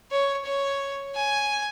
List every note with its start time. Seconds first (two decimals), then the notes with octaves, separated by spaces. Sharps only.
0.11 C#5
0.45 C#5
1.15 G#5